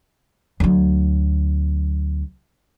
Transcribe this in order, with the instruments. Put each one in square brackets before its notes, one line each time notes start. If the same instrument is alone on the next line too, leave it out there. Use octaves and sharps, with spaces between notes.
[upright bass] D2 F#3